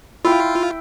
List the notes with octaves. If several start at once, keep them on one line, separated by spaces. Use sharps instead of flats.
E4 F4 G5